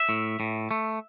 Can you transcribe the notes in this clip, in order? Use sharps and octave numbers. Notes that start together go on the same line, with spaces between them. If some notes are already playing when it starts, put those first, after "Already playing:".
Already playing: E5
A2
A2
A3